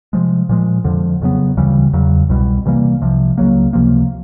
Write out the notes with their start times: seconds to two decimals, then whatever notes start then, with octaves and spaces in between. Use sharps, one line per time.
0.13 C3 F3 G#3
0.49 A#2 F3 G#3
0.85 F2 D3 F3
1.22 F2 C#3 F#3 B3
1.57 D2 C#3 E3 G3
1.93 E2 C#3 F#3
2.29 C2 B2 G3
2.65 C3 E3 G3 A#3
3.02 C2 C3 F3
3.38 C#2 C#3 F#3 A#3
3.73 C#2 C3 F3 A#3